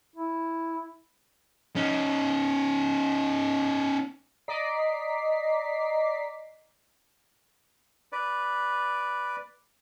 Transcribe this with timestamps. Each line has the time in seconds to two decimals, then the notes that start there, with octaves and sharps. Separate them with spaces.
0.16 E4
1.76 C#4 D#4
4.48 D5 D#5 A#5 D6 B6 C7
8.12 B4 D5